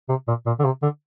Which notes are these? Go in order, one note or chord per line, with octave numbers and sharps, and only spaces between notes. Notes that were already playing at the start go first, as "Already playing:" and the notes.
C3
A#2
A#2
D3
C3
D3